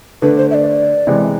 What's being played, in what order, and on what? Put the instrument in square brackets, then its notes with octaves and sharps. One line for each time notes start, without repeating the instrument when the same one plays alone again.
[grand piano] D3 A3 D4 [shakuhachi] B4
[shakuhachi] C5
E5
D5
[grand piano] C3 E3 G#3